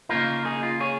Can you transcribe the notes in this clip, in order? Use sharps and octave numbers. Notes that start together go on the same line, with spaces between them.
C#3 A#3 D#4 F4 A#4
D#4 G#4
F4
G#4 C#5